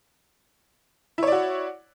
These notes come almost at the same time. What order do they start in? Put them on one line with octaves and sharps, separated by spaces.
E4 C#5 D5 F#4